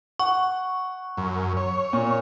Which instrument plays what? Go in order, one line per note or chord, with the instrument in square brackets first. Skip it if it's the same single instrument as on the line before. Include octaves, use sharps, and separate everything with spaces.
[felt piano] F#5 [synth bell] C#6
[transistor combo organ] F#2
C#5
[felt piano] A#2